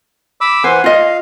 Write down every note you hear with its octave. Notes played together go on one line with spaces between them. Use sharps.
B5 D6 E6
E3 C5 F#5 G#5
F4 D#5 F5